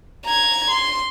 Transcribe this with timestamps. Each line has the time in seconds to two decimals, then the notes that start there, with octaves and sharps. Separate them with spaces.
0.25 A#5 G#6
0.70 C6